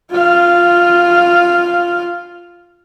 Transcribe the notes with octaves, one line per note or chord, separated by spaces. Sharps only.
F4 F5